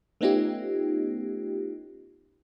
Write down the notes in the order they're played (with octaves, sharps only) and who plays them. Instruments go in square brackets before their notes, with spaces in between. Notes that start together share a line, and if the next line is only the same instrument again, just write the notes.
[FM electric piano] A3 B3 C#4 D#4 F4 G4